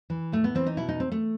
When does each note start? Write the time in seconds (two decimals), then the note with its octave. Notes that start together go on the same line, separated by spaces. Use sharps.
0.10 E3
0.32 A2 A3
0.44 B3
0.55 E3 C4
0.66 D#4
0.77 B2 E4
0.89 D#4
1.00 C4
1.12 A3